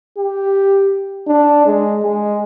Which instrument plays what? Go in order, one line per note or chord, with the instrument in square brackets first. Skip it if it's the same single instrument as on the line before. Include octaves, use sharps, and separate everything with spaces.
[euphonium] G4
D4
G#3
G#3